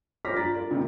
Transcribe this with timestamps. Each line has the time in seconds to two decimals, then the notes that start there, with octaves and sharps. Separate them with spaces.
0.25 C5 C#5 D6 F6 A#6 B6
0.36 G2 F4 D5 A#5 A6 B6
0.54 F4 A#4 D5
0.70 C#2 G#2 C3 D#3 A#3